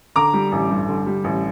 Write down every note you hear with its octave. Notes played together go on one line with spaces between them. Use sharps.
D3 A#5 D6
G3
A1
G2
D3
G3
A1